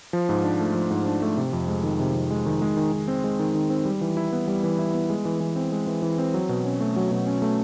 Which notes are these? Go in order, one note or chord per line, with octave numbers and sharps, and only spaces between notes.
F3
G#2
D4
A3
F3
G#2
D4
A3
C3
F2
G#3
D#3
C3
F2
G#3
D#3
G#3
D#3
D#3
C4
G#3
D#3
D#3
C4
G3
E3
E4
B3
G3
E3
E4
B3
G#3
E3
E3
C4
G#3
E3
E3
C4
F#3
B2
C#4
A3
F#3
B2
C#4
A3